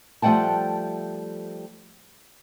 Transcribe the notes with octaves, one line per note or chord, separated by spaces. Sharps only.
F3 G3 A3 F#5 G5 A5